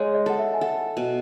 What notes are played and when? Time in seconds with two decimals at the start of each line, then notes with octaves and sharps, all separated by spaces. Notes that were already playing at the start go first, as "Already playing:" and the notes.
Already playing: G#3 C#5
0.15 D#5
0.26 A4 F#5
0.38 E5
0.54 G#5
0.61 A4 F#5
0.97 B2